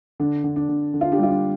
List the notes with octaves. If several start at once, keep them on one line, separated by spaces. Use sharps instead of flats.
D3 D4
D3
D4
D3
D3
F4
D4 G4
G3 F4
D4